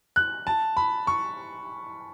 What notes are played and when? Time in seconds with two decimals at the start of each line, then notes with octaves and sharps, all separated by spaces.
0.16 F#6
0.47 A5
0.77 B5
1.07 C#6